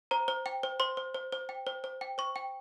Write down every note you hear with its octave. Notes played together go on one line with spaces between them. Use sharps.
C5 A#5
C5
G5
C5
C5 C6
C5
C5
C5
G5
C5
C5
G5
C5 C#6
G5